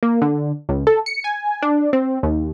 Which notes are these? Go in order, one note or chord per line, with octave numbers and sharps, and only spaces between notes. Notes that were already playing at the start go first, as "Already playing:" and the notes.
A#3
D3
C#2
A4
C#7
G#5
D4
C4
D#2